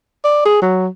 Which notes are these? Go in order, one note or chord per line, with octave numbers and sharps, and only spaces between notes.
D5
G#4
F#3